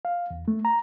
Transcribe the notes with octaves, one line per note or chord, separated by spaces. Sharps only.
F5
E2
A3
A#5